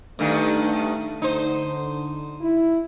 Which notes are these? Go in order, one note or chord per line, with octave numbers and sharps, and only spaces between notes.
G2 D#3 A3
D3 D#4 C5
E4